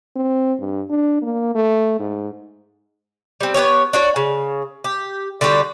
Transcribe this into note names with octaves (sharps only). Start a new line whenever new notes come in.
C4
G2
D4
A#3
A3
G#2
G3 C4
B3 C#4 G4 C#5
D4 F#4 C#5
C#3
G4
D3 G3 F#4 G4